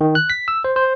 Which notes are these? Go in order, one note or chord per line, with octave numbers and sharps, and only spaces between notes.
D#3
F#6
B6
E6
C5
C5